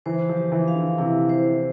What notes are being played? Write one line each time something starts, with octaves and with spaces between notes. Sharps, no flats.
E3 C5
F3
G4
E3
F5
D3
C3 E4
C5